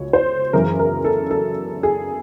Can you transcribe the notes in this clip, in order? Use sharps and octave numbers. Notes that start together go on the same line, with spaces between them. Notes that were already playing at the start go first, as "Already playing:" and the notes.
Already playing: C#2 F#3 C#5
C5
F#2 C#3 E3 A#4
A#4
A4
A4
G#4